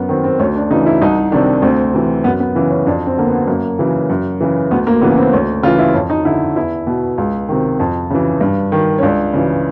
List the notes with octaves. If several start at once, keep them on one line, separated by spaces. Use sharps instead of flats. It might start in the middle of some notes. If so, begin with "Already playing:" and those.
Already playing: F#2 B3
D#3 C4
C4
D2 C#4
D4
C#3 E3 D#4
E4
C2 D#4
C3 D#3 D4
D2 C4
C3 E3
F#2 B3
B3
C#3 E3
C#4
F2 D4
C4
D3 A#3
B3
F#2 A#3
C#3 E3
F#2
C#3 E3
D2 B3
A#3
C#3 E3 B3
C4
D2 C#4
C#3 E3 F4
E4
F2 C#4
D#4
D3 E4
E2 E4
B2
C#2
C3 D#3
F2
C#3 E3
G2
D#3
C#4
C#2 D4
C#3 E3